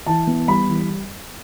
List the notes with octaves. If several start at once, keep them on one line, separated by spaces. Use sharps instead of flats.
E3 A5
B3
G3 B5
E3